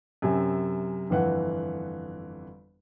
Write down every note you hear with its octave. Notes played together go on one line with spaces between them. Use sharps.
F#2 C3 G#5
G1 F2 E3 F#5